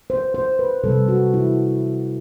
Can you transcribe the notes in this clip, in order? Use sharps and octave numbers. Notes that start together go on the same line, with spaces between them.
C5
C5
B4
C3 G3 A4
F#4
E4